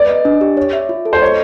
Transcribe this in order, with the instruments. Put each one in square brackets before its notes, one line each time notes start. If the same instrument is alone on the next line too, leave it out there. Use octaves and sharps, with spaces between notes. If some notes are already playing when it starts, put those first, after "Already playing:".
Already playing: [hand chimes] B4 [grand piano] D5
[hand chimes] D#5
D4
G4
C#5
E5
F4
A4
[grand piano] C5
[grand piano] C#5 [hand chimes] D#5